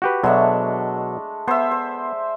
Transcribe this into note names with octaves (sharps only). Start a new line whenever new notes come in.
F#4 G4 B4
B2 F#3 G#3 A3 D4
B3 C5 E5
C5